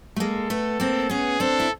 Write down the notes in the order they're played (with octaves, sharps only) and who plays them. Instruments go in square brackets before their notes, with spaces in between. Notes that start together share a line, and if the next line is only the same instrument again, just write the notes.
[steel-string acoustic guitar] A3
[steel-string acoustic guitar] G#3 A#3 [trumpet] A4
[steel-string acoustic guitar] A3 B3
A#3 C4
[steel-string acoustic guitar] B3 C#4 [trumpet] G#4
[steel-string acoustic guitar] C4 D4 [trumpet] A4
[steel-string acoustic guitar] E4